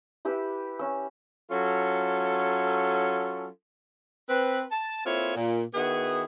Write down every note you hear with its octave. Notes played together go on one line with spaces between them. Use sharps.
E4 G4 B4 E6
C#4 E6
F#3 C#4 F4 A4
C4 B4
A5
A#3 C4 E4 F4 A4 C#5
A#2
D#3 B3 E4 F#4 G#4